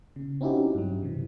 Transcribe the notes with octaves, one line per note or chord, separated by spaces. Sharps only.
C#3
C4 C#4 D#4 E4 F#4 G4
G2 F#3
C3 E3